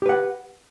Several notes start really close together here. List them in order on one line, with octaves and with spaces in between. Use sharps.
G4 B4 F#5